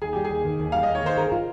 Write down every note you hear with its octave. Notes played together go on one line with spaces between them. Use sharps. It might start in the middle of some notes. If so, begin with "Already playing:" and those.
D#2 G#4
G3 G4
G#4
D#2
D#3
D#2
G3 F5
D#5
D#2
C#5
D#3 C5
G#4 A#4
F4